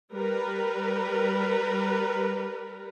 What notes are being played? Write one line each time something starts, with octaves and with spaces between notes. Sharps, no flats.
G3 A#4 B4